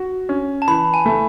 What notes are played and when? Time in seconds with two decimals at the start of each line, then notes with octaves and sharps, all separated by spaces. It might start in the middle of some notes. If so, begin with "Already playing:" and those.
Already playing: F#4
0.29 C#4
0.62 A5
0.68 E3 B5
0.94 G#5
1.06 A3